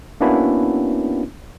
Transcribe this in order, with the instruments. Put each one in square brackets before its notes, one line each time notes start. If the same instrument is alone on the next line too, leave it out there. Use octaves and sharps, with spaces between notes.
[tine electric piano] A#3 B3 C#4 D4 E4 F#4